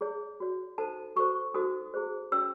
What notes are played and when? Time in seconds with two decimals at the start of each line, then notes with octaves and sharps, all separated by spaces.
0.01 E4 G#4 C#5
0.40 F#4 C#5
0.78 D#4 A4 C5 A5
1.16 F#4 A4 C5 C#6
1.54 D#4 F#4 A4 C5 D#6
1.94 E4 G#4 C5
2.31 C#4 F#4 C#5 E6